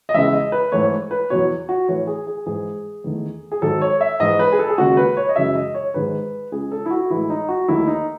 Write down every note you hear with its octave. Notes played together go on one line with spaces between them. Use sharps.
D#5
E2 C#3 G#3 E5
D#5
B4
G#2 E3 A3 C#5
B4
E2 B2 F#3 C#5
F#4
A2 E3 A3 C#5
G#4
G#4
G#2 E3 G#3 G#4
E2 D#3 A3
G#4
G#2 D#3 F#3 A4
C#5
E5
G#2 E3 G#3 D#5
B4
G#4
A4
G#4
D#2 C#3 G#3 F#4
B4
C#5
D#5
F#2 C#3 E3 G#3 E5
D#5
C#5
G#2 D#3 G#3 B4
C#2 C#3 G#3 G#4
A4
E4
F#4
A2 E3 G#3 E4
D#4
F#4
D#2 D#3 A3 E4
D#4